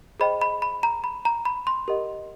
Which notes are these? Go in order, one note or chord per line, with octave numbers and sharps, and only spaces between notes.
G#4 C5 D#5 G5 B5
B5
B5
A#5
B5
A#5
B5
C6
G4 A#4 D#5 F#5